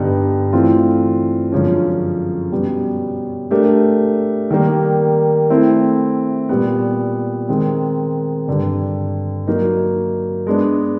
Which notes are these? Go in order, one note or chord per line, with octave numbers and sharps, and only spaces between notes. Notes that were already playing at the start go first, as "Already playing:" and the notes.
Already playing: G2 D3 G3 B3 D#4
E3 A3 C4 F4
F#2 D3 F3 G#3 C#4
B2 G3 B3
A3 D4 G4 A#4
D#3 G3 A#3
A3 C4 E4
A#2 G3 B3
D#3 G#3 C4
G2 D3 G3
F#3 A#3 D#4
G#3 B3 D4